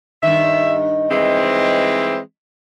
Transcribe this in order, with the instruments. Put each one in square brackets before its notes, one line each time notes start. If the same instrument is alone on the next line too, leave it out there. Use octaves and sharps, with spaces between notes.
[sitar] G2 D#3 [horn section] E5
[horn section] E3 G#3 C4